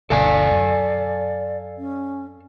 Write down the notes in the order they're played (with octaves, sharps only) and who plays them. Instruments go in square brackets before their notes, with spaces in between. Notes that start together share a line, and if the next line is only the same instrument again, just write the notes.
[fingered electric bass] G1 D2 B2 [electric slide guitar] A4 F5 G#5 [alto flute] D5
[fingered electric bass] F#2
[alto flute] C#4